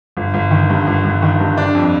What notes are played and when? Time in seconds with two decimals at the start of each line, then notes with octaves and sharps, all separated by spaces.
0.17 G1
0.34 G1
0.51 D#3
0.70 G2
0.87 G1
1.04 G1
1.22 D#3
1.40 G2
1.57 D4
1.75 F2